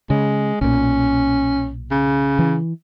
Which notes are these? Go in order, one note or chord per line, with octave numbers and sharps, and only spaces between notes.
C#3 G#3
B1 A#2 C#4
C#3
E3